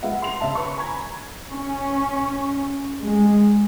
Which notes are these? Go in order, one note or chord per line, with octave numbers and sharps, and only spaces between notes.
G#3 F4 B4 E5 F#5
C6 F7
C#3 E5 A5
B4 C#6
G#5 A#5 B5 G#6
C#4
G#3